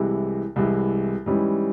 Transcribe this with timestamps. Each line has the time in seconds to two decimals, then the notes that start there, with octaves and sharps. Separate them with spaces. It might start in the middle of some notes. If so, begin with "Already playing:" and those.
Already playing: C2 C3 E3 G#3
0.56 C2 C3 E3 G#3
1.26 G#2 E3 G3 C#4